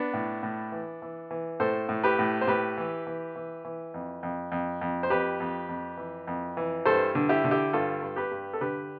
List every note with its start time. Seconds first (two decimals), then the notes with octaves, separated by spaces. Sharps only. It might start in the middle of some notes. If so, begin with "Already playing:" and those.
Already playing: B3 D4
0.14 A2
0.43 A2
0.72 E3
1.02 E3
1.31 E3
1.60 A2 A4 C5
1.89 A2
2.04 G4 B4
2.19 A2
2.41 C5
2.47 A2 G4 B4
2.77 E3
3.07 E3
3.36 E3
3.65 E3
3.94 F2
4.23 F2
4.52 F2
4.81 F2
5.03 C5
5.10 F2 G4 B4
5.40 F2
5.69 F2
5.97 E3
6.27 F2
6.57 E3
6.85 G2 A4 C5
7.15 D3
7.29 E4 G4
7.44 D3
7.51 E4 G4
7.73 G2 F4 A4
8.02 G2
8.16 G4 B4
8.32 G2
8.53 A4
8.61 D3 G4 B4